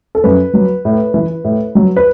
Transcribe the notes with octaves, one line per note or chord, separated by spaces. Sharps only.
A4
F#2 B4
F#3
A2
E3
A2
F#3
B4